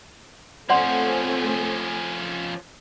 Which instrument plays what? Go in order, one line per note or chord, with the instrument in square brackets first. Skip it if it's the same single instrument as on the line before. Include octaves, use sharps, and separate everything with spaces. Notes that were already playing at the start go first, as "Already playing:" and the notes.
[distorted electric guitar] F3 C#4 [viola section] A3 C4 G#5 [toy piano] D5 F#5 C6